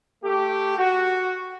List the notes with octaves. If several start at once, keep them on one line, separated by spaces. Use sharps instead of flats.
A3 G4
F#4